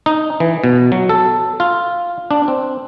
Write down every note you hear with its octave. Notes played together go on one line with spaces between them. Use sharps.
D#4
E3
B2
F#3
A4
F4
D4
C4